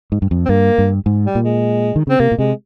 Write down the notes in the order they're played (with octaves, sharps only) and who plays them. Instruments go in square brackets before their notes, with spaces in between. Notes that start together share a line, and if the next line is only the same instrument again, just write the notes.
[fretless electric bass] G#2
G2
F2
[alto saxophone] C4
[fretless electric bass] G2 [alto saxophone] A#3
[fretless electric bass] G2
G#2
[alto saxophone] G3
[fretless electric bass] A#2
[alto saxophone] G#3
[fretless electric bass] D#3
[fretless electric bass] C#3 [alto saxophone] C4
[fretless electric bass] C3 [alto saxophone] A#3
[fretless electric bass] A#2
[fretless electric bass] C3 [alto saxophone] G#3